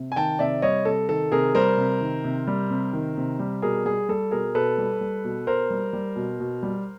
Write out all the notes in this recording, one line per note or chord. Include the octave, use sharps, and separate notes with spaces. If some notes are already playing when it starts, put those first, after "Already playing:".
Already playing: C3
G#5
D#3 G5 A5
C3 D5 E5
G3 C#5 D#5
C3 A4
D#3 A4
C3 G#4 A#4
G3 A#4 C5
C3
D#3
C3
G3
C3
D#3
C3
G3
B2 G#4 A#4
G3 G#4
G3 A4
B2 G#4 A#4
B2 A4 B4
G3
G3
B2
B2 A#4 C5
G3
G3
B2
B2
G3